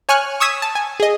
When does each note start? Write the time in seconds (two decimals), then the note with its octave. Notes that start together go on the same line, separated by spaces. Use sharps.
0.09 C#5 G#5 C#6 F6 F#6
0.40 C#6 D#6 E6 G#6 B6
0.62 A5
0.75 G#5
1.00 G#4 D#5